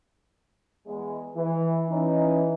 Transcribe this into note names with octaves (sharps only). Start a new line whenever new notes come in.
E2 G#3
E3
E3 C#4 D#4